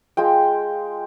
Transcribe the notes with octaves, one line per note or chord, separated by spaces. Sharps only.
G#3 F4 G5